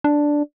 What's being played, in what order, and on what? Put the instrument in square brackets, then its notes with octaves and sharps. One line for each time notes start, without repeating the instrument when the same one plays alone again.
[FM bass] D4